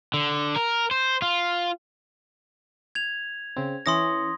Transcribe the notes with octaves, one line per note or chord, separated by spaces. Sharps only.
D3
A#4
C5
F4
G#6 F7
C#3 C4
E3 C#4 C6 C#6 D#6 A#6